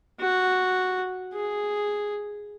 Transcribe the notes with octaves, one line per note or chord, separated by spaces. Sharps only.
F#4
G#4